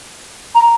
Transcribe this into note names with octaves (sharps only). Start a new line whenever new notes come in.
A#5